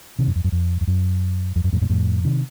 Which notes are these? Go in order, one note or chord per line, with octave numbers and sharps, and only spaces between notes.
C3 D#3
F#2
F2
F#2
F2
F2
F#2
F2
F#2
F2 A2
F#2 A#2
F2 A2
C3 D#3